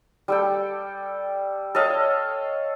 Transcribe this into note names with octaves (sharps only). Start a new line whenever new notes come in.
G3 A4 G5
A4 C#5 D#5 F5